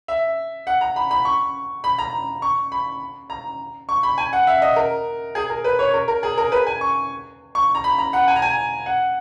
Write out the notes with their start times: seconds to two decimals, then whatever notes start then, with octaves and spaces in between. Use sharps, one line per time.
0.08 E5
0.67 F#5
0.81 A#5
0.96 B5
1.11 B5
1.25 C#6
1.84 B5
1.98 A#5
2.42 C#6
2.72 B5
3.30 A#5
3.89 C#6
4.03 B5
4.18 G#5
4.33 F#5
4.47 E5
4.62 D#5
4.76 A#4
5.35 G#4
5.50 A#4
5.64 B4
5.79 C#5
5.94 A#4
6.08 A#4
6.23 G#4
6.38 A#4
6.52 B4
6.67 G#5
6.81 C#6
7.55 C#6
7.75 A#5
7.84 B5
7.98 A#5
8.13 F#5
8.28 G#5
8.36 A#5
8.42 G#5
8.86 F#5